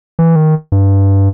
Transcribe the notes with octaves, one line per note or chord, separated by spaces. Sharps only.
E3
D#3
G2